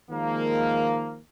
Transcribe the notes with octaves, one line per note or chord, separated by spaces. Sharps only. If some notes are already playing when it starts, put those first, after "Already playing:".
D#3 F3 G#3 A#3